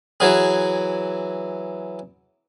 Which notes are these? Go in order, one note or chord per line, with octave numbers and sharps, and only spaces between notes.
E3 F#3 G#4